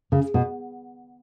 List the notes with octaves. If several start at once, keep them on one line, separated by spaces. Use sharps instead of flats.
C#3
B2